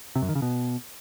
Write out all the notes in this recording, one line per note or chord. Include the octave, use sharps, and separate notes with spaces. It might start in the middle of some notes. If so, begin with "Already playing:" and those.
C3
F#2
D#3
C#3
B2